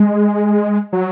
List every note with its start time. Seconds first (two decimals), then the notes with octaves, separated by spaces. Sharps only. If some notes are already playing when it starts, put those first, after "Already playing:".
Already playing: G#3
0.93 F#3